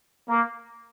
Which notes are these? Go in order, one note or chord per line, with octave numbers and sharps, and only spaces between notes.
A#3